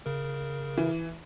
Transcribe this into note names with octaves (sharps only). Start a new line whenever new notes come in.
C#3 A#4
E3